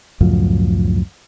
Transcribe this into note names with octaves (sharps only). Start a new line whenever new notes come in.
C#2 F#2 A2 F3